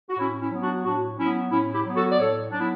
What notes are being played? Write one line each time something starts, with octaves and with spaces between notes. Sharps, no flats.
F#4
A2 C#4 E4
C#4 E4
F#3 B3
D4 F#4
A2 D4 F#4
F#3 B3 C#4 E4
A2 C#4 E4
E4 G4
F#3 B3
F#4 A4
D5
A2 A4 C#5
F#3 D4
B3 E4